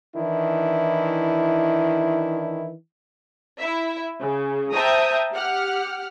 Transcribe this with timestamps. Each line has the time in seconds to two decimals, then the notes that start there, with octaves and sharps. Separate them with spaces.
0.16 D#3 E3 D4 E4
3.59 E4 E5
4.20 C#3
4.72 C5 E5 G5 A5 A#5 D#6
5.32 G4 F#5 F6